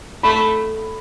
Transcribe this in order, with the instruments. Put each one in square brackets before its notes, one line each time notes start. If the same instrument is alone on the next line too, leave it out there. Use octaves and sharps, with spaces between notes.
[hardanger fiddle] A3 [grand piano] B5